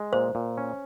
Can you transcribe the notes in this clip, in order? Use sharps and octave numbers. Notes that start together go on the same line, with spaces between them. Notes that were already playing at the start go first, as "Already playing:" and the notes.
Already playing: G#3
A#2 C5
A#2
C#4